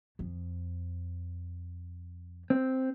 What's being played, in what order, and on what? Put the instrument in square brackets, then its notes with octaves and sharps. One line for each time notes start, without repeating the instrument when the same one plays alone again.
[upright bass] F2
[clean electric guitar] C4